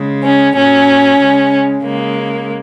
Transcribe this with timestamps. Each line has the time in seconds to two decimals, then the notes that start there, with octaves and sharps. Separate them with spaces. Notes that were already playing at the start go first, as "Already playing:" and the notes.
Already playing: C#3 G#3
0.22 C#4
0.56 A#2 F#3 C#4
1.19 C#3
1.24 G#3
1.83 C#3 G#3 A#3